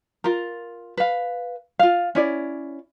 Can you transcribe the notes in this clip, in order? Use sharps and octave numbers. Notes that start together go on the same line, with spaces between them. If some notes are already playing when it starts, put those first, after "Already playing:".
F4 A#4
B4 F5
F4 F5
C#4 E4 D5